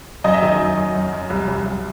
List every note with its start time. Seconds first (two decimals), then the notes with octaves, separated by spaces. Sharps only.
0.24 F#2 D#5
0.34 E5
0.42 D#3 D#5
0.60 F#2
0.77 F#2
0.95 F#2
1.13 F#2
1.30 C2
1.48 C2
1.66 C2